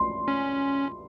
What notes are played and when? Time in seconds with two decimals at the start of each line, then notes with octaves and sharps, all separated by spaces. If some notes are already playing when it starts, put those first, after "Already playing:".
Already playing: C6
0.28 C#4